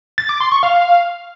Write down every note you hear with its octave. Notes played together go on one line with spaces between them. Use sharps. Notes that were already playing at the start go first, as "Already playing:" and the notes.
A6
D6
C6
C#6
F5